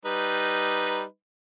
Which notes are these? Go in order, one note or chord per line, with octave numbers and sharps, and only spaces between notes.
G3 D#4 B4